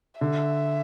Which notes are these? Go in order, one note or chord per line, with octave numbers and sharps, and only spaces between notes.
D3 E5